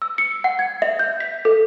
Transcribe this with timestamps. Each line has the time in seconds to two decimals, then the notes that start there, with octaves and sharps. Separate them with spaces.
0.02 E6
0.18 C#7
0.44 F#5
0.59 G#6
0.82 E5
0.99 G6
1.20 B6
1.45 A4